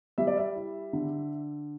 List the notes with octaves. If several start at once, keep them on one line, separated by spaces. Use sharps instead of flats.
G3 E5
D5
E5
E4
D3